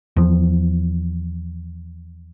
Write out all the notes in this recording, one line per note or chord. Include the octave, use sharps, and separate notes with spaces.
E2 F3